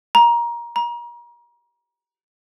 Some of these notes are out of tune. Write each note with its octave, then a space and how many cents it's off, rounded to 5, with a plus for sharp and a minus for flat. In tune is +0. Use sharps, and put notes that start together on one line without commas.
A#5 +20
A#5 +35